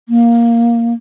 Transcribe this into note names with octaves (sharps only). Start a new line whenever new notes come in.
A#3